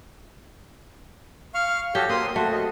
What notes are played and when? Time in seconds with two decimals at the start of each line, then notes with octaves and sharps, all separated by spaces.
1.54 F5 C#6 F6
1.95 F#4 G4 A4 C#5
2.09 A#3 C4 C6 D#6
2.36 A3 F#4
2.52 D#5